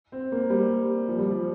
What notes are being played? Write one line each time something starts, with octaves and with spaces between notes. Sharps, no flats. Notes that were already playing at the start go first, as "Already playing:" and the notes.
C4
A#3
G3
F3
G3
F3